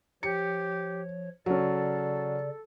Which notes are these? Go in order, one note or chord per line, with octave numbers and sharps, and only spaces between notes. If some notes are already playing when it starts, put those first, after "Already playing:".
F3 G4 C#5 C#7
C#3 F#3 C#4 A4 D5